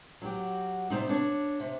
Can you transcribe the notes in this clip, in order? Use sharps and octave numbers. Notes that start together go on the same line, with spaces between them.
F#3 F#4 G4
C3 G3 C4 D#4
D4 C#5
C3